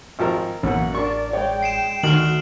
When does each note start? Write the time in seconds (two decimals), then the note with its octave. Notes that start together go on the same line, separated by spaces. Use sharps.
0.19 G#1 F3 A#4
0.63 A1 F#2 B2 A#3 F#5
0.95 D4 A#4 D5 C#6
1.33 G#3 C#5 D5 G5
1.63 C7 D7 E7
2.03 D2 D#3 A3 F#4 F6 C7 F#7